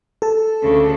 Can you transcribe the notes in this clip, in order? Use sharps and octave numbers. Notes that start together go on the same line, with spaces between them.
A4 A5
D2 C#3